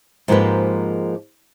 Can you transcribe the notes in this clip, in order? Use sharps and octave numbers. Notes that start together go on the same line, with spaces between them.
G#2 F3 G#3 A#3 G4 B4